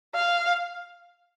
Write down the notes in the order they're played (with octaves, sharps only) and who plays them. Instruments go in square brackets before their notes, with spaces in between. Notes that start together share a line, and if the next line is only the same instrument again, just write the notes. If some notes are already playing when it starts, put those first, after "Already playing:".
[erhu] F5